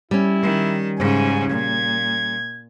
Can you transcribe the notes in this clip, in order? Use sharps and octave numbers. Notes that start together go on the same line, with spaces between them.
G3 C#4 E4
D#3
G#2 C#3 G#5
A#2 G#6